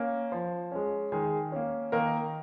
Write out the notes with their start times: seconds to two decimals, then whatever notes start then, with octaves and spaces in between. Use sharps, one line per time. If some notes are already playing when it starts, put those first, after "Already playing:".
Already playing: A#3 C#4
0.32 F3
0.72 G#3 C#4
1.12 D#3 G#3 G#4
1.52 A#3 C#4
1.92 D#3 A#3 A#4